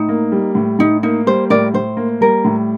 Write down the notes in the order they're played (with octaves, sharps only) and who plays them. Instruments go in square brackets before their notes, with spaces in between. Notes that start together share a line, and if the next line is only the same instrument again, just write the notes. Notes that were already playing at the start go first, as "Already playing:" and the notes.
Already playing: [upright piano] A2 [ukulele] D#4
[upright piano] A#3
G3
A2
[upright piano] A2 [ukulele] D#4
[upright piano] A#3 [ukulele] D#4
[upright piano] G3 [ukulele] C5
[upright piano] A2 [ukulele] A#4 D5
[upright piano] A2 [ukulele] C5
[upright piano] A#3
[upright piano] G3 [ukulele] A#4
[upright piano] A2